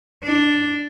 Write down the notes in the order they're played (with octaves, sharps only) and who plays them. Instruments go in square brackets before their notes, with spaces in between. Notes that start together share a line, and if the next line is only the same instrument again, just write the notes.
[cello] D4